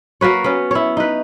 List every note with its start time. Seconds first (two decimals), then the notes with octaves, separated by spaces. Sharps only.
0.21 A#3 F#4 B4 C#5
0.44 B3 C#4
0.71 E4 C#5
0.97 D#4 B4